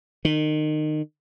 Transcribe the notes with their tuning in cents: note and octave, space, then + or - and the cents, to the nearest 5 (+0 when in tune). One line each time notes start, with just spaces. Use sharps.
D#3 -25